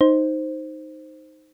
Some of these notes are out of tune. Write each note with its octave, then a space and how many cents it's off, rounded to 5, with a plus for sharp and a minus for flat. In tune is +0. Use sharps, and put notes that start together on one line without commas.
D#4 +0 C5 +0